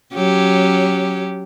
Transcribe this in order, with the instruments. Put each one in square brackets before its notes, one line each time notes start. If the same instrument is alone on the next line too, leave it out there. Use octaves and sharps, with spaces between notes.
[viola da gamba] F#3 C#4 G4